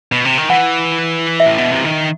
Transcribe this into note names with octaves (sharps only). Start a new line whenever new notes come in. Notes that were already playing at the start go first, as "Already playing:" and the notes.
B2
C3
D#3
E3 F#5
E5
A2
B2
C3
D#3